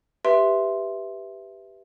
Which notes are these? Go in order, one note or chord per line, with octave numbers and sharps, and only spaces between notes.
G4 B4 E5 C6